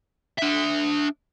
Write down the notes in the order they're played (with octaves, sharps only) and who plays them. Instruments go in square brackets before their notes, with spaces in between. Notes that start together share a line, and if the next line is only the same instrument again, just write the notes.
[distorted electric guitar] D4 E5